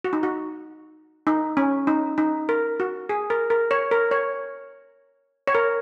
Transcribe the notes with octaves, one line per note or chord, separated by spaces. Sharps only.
F#4
D#4
F#4
D#4
C#4
D#4
D#4
A#4
F#4
G#4
A#4
A#4
C#5
A#4
C#5
C#5
A#4